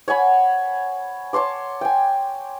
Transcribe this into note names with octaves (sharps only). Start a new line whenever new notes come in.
C#5 F#5 G#5 B5
C#5 A5 C6 D6
G5 G#5